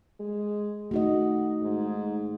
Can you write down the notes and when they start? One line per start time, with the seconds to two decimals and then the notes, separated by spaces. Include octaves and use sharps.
0.20 G#3
0.91 A3 D#4 F#4 D#5
1.62 G#2